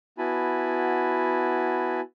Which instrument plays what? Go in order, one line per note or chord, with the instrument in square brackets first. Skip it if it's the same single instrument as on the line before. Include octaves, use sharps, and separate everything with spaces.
[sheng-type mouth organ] B3 E4 F#4 G#5 A5 B5